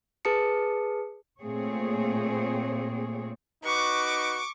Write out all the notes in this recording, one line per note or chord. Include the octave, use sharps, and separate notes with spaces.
G#4 B4 A5 D#6 C#7
A#2 A3 C4 G#4 C#5
D#4 F#4 B4 C#6 D6